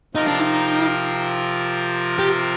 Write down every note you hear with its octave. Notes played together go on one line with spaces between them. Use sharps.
C3 F3 C4 D#4 F4 A#4
D4
D#4
G4